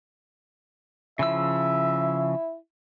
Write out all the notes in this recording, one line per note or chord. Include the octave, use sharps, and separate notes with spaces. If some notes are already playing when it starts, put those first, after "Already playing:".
C#3 F3 E4 E5 E6